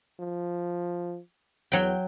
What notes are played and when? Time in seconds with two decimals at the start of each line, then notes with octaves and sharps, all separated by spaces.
0.20 F3
1.72 E2 F#3 G5